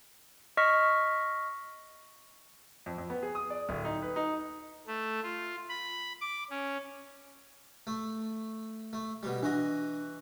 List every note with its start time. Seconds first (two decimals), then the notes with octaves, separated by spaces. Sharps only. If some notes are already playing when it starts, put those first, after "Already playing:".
0.57 D#5 C#6 F6 B6
2.86 F2
2.98 F2
3.10 B3
3.22 G#4
3.35 D#6
3.50 D5
3.69 D1
3.85 D#4
4.02 B4
4.16 D#4
4.87 A3
5.23 F4
5.69 B5
6.21 D6
6.50 C#4
7.87 A3
8.93 A3
9.23 B2 G3
9.43 E3 D4 F#4 D#5